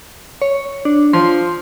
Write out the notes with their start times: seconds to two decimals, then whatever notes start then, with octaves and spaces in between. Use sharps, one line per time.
0.42 C#5
0.85 D4
1.13 F3 C6